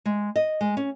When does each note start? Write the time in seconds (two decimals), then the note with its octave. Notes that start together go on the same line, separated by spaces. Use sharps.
0.05 G#3
0.36 D#5
0.61 G#3
0.77 C#4